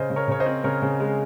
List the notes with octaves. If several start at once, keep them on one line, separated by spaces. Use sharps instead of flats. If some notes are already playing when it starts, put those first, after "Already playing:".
Already playing: C#3 C5 D#5
C#3
A#4 C#5
C#3 C#5
C5 D#5
C4
C#3 A#4 C#5
C#3
G#3